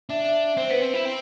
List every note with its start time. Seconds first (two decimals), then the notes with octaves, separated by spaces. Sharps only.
0.09 D4 E5
0.25 E5
0.57 C4 C5
0.70 B3 B4
0.82 C4 C5
0.94 E4
1.05 C4